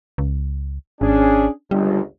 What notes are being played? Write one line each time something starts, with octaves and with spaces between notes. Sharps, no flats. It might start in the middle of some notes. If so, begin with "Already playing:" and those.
C#2
G#1 C#4 D4 G#4
G1 C#2 G3